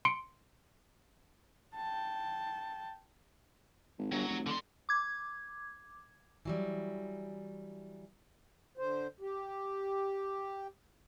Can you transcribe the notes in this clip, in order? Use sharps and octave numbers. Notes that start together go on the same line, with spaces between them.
C6 C#7 D7
G5 A5
G#1
G1 F#3
F1
D3 C6
D6 G#6
E3 F#3 G3
D3 C5
G4